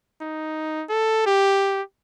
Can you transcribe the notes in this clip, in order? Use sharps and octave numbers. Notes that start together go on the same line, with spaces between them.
D#4
A4
G4